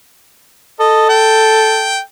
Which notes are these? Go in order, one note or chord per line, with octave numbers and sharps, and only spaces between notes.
A4 D#5
G5